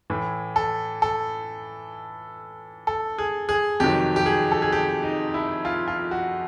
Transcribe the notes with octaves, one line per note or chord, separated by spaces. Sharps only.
A2 E3
A4
A4
A4
G#4
G#4
F2 C3 D#3 F#3 G4
G4
G#4
A4
G#4
G4
D#4
E4
F4
F4
F#4